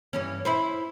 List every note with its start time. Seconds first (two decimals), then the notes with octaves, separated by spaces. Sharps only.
0.13 G2 E3 C#4
0.45 E4 B4 C5